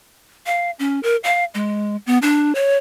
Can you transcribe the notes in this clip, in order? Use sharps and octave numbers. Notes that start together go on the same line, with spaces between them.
F5
C#4
A#4
F5
G#3
B3
D4
C#5